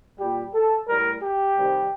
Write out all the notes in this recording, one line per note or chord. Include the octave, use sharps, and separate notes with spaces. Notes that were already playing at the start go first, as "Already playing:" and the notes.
A#2 G3 G4
A4
A2 G3 A#4
G4
C3 D#3 G3